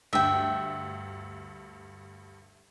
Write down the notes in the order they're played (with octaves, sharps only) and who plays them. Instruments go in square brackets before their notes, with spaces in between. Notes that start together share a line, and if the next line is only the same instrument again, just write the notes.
[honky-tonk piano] D2 G2 [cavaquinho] E5 G5